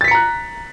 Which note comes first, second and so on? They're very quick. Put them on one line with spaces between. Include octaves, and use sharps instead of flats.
A6 B6 C#7 A#5 F#6